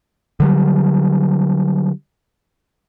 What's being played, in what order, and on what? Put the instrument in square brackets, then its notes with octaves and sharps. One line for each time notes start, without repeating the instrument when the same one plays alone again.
[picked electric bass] D3 F#3 G3